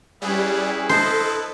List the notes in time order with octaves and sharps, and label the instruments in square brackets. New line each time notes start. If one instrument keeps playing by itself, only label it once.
[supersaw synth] G3 [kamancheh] C#4 G#4 [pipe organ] E4 B4
[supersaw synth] A4 [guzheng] C5 [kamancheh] D#5